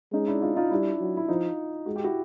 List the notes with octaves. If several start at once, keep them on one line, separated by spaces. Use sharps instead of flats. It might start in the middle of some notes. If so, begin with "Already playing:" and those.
G#3 C#4 D#4
D4 E4
D#4 F4
D#4 F4
G3 D4 E4
F#3
E4
F3 D#4 F4
G#3 F#4
G4
E4 F#4